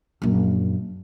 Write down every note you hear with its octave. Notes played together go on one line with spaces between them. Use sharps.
A#1 F#2